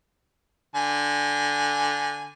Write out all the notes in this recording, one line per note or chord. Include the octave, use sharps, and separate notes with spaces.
D3 G#5